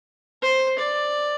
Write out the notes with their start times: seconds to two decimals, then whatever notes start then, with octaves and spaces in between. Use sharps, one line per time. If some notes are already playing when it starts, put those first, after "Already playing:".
0.43 C5
0.78 D5